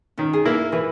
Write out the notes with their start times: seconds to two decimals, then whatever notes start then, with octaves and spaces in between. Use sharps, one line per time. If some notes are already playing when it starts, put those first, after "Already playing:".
0.18 D#3 C#4
0.33 G#4
0.45 A#3 E4 A#4
0.72 E3 B4